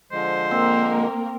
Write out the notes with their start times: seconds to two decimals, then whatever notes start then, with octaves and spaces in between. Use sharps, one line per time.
0.12 D3 F3 G#3 C5
0.51 A#3 C4 A#4